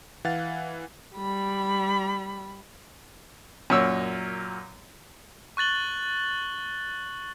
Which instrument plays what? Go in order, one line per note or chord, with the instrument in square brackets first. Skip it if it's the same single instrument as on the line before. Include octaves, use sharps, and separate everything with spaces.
[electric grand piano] E3 F5 F#5 A6
[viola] G3 B5
[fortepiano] F#2 A#2 C#5 E6
[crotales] C#6 F#6 A6 F#7 G7